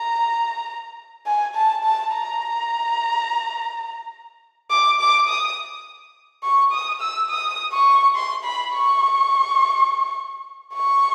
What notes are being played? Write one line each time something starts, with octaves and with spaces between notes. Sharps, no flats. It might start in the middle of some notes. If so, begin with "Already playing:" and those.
Already playing: A#5
G#5
A5
A5
A#5
D6
D6
D#6
C#6
D#6
E6
D#6
C#6
C6
B5
C#6
C#6